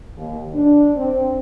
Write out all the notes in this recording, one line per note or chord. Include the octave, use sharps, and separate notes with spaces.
D#2
D4
C4